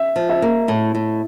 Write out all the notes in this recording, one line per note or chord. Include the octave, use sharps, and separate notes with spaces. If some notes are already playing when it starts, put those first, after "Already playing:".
Already playing: E5
F3
E5
A#3
A2
A2